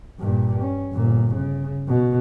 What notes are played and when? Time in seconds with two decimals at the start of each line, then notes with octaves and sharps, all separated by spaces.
0.20 G2 A#2
0.63 C#4
0.93 G1 A#2
1.34 C#3
1.88 B2